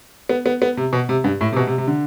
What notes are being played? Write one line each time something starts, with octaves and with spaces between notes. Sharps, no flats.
B3
B3
B3
C3
B2
C3
G2
A2
C3
B2
C3
C3
D3